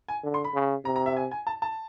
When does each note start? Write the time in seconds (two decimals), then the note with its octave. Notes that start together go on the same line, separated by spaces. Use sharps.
0.08 G#5
0.24 D3
0.34 C6
0.44 B5
0.54 C#3
0.85 C3 A#5
0.96 A#5
1.06 E5
1.17 G#5
1.31 G#5
1.47 A5
1.62 A5